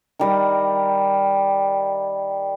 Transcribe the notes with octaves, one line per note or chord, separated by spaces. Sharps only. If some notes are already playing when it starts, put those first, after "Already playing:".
D#3 G3 A#4